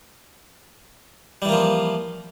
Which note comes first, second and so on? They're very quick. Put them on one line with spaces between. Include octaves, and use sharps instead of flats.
G3 E3 A#3 F3